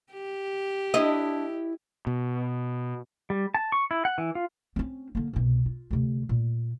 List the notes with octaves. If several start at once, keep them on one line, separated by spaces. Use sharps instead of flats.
G4
D4 E4 D#5
B2
G3
A5
C#6
E4
F#5
E3
F4
C4 C#4
D3 A#3
C2 B2
F4
D2 C3
A#2